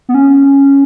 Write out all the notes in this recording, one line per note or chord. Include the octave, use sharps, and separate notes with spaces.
B3
C#4